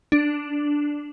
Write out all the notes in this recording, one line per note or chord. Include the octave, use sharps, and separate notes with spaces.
D4